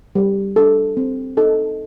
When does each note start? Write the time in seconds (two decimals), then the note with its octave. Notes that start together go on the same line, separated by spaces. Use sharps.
0.15 G3
0.56 D4 A4
0.97 C4
1.37 D#4 A4